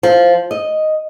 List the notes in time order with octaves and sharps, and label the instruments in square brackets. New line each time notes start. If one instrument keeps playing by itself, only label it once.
[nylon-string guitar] F3
D#5